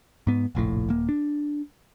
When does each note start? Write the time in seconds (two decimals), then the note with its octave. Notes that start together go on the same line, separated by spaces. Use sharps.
0.27 G#2 B3
0.55 F1 A#1 A2
0.89 D#1 A#3
1.09 D4